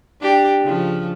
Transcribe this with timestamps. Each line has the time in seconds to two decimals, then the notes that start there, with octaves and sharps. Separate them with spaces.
0.21 D4 G4
0.61 C#3 F3